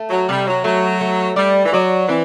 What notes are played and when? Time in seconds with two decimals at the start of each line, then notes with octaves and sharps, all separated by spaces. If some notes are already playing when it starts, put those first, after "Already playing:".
Already playing: A3
0.10 F#3
0.29 C3 G3
0.47 F#3
0.64 F#3 A3
1.01 A3
1.36 G3 D5
1.66 E3
1.72 F#3 D5
2.09 E3 C4